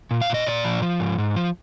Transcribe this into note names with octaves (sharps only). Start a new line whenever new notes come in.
A#2
F5
A#2 D#5
A#2 D5
F3
F3
G#2
G#2
F3